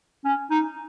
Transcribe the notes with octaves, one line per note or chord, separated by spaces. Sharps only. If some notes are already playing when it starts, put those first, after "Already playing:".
C#4
D#4